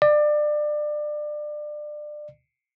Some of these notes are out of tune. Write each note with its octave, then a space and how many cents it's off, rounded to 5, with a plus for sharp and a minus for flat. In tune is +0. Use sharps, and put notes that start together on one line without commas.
D5 +25